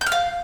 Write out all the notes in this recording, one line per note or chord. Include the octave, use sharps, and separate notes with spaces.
G6
F6
F5